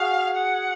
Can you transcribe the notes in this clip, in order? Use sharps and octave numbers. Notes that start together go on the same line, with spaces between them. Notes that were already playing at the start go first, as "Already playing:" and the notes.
Already playing: F#4 G#4 F5
F#5